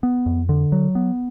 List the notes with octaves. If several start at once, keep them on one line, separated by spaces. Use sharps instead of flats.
B3
F2
D3
F#3
B3